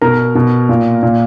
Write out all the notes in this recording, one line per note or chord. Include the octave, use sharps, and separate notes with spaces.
B2 A#4 A#5
B2
A#2
A#2